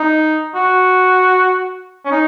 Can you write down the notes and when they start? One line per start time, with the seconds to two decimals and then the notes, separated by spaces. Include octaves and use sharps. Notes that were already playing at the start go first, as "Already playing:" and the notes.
Already playing: D#4
0.55 F#4
2.05 C#4
2.12 D#4